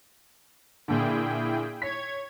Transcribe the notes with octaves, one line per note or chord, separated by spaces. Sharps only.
A#2 D3 E4 G#4 G5
C#5 G#6 B6